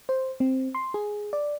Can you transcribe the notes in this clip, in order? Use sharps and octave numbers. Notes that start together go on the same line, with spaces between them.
C5
C4
C6
G#4
D5